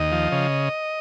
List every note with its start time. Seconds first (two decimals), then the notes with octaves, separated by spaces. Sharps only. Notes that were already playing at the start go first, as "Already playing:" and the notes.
Already playing: D#2 D#5
0.12 F3
0.32 C#3